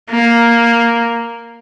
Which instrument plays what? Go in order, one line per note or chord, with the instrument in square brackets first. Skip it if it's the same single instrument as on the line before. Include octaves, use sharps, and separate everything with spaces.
[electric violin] A#3